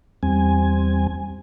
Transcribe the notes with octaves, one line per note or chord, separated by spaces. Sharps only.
E2 G3 C4 G#5